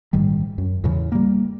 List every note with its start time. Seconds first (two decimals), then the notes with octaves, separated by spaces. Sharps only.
0.13 A#1 G#2 D#3 G3
0.58 F#2
0.84 E2 A2 C#3 E3
1.12 G3 A#3